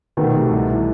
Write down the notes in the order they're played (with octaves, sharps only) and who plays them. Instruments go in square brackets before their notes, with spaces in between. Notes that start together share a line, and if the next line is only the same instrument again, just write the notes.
[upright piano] B2 D#3 [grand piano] A3
[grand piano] C3
C2
E3